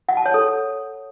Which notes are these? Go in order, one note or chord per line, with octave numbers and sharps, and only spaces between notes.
F#5
A5
C#5
A4